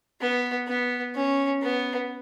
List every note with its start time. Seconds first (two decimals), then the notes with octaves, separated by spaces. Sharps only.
0.21 B3
0.68 B3
1.15 C#4
1.62 B3